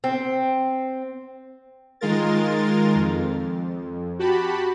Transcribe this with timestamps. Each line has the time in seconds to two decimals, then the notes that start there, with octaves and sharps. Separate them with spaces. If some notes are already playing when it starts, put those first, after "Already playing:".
0.04 C4
2.01 D#3 G#3 F4 A#4 A6
2.95 F2
4.19 F#4 G4 A5 B5